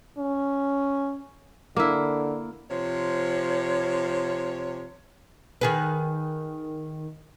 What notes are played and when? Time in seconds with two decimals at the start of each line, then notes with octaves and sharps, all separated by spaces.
0.18 C#4
1.76 D3 A#3 E4
2.71 C3 F3 C#5
5.61 D#3 G#4 B4